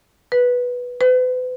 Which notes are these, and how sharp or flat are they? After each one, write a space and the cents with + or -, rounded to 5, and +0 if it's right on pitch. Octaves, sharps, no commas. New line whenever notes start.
B4 -5
B4 +40